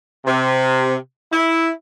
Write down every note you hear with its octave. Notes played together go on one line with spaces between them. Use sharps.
C3
E4